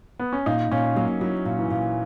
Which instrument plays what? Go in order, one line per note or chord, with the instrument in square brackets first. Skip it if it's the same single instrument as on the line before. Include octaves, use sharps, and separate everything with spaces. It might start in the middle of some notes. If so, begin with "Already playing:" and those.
[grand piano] B3
C#4
[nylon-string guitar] A#2 [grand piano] D#4
[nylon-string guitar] A#2 [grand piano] C#4
[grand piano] F#3 [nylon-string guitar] A#3
[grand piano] F#3 [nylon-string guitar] E4
[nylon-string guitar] A#2
[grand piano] E3
[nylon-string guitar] A#2